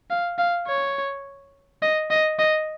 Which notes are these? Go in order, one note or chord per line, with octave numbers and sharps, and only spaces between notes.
F5
F5
C#5
D#5
D#5
D#5